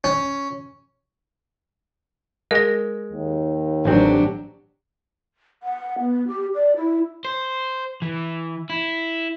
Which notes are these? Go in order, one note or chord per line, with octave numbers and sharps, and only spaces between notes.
C#4
G#3 A#4 A#6
D#2
A1 F#3 C4 D4 G4
F#5
B3
G4
D5
E4
C5
E3
E4